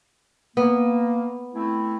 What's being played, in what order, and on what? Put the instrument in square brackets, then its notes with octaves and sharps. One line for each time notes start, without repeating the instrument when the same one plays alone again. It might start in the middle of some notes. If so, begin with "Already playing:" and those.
[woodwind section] A#3 [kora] B3
[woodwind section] A3 C4 E4